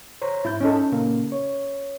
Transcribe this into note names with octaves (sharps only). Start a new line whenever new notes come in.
C5 C#5 A#5
G#2 E4 G6
C#4 D#4 A4
A#2 C#3 A#3
C#5